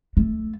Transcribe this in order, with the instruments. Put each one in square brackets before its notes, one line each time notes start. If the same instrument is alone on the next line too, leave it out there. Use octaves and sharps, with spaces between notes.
[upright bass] A3